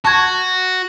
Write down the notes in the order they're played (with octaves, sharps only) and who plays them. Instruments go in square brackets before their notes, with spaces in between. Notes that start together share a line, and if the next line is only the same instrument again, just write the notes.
[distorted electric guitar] F#4 [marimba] A5 C#6 G#6